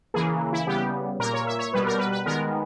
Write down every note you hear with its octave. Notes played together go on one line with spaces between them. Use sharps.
C#3 E3 A#3 G#4
E4
C#3 G3 B3 G4
A#2 A#3 A#4
C#5
E5
C#5
B2 G3 B3 B4
A#4
B4
B4
D#3 G#3 B3 A#4